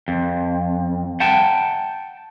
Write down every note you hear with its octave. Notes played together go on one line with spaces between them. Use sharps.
F2
F#5 G5 A5